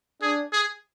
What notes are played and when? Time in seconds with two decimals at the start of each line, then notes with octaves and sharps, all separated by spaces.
0.22 D4 G#4
0.53 G#4